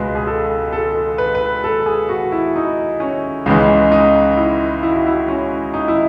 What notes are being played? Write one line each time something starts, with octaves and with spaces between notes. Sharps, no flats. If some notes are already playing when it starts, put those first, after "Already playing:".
Already playing: C#2 B2 G#3 B4
G#4
A4
A4
B4
B4
A4
G#4
F#4
E4
D#4
C#4
C#2 C#3 E3 G#3 D#4
D#4
E4
E4
F#4
E4
C#4
D#4
E4